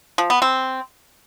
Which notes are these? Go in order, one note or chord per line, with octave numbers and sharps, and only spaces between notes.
F3
B3
C4